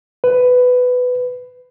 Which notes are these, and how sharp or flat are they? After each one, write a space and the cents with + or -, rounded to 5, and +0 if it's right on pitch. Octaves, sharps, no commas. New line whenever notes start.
B4 +10